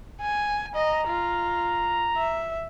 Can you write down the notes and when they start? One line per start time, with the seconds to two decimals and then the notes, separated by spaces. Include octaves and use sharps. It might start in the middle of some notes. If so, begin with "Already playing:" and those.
0.21 G#5
0.75 D#5 A#5
1.07 F4
2.17 E5